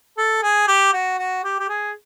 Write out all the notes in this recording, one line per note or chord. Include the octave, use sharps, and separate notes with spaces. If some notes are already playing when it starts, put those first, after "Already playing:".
A4
G#4
G4
F#4
F#4
G4
G4
G#4